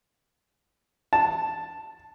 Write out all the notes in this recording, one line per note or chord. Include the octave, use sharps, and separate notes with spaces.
A5